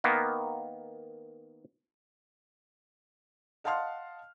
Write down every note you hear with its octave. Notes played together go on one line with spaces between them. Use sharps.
D#3 A#3 B3
D#5 F5 F#5 A5 C6 F6